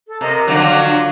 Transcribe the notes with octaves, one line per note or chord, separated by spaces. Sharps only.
A4
C3 A#4 D#5 A#5
D3 F3 F#3 D6